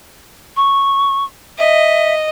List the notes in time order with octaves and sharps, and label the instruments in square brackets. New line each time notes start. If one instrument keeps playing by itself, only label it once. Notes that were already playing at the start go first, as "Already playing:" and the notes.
[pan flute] C#6
[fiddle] D#5 [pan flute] E5